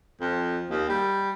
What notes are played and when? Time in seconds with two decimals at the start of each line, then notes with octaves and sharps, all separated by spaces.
0.20 F2
0.70 D#2
0.89 G3